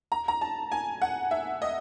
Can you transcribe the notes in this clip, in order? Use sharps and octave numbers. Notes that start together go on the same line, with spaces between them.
A#5
A#5
A5
G#5
F#5
E5
D#5